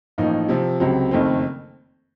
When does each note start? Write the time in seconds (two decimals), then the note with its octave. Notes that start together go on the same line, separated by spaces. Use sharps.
0.18 A1 A2 F3 A#3 D#4
0.49 C3 F3 C4
0.80 C#2 C3 F#3 C4
1.11 F#1 F2 D#3 A3 C4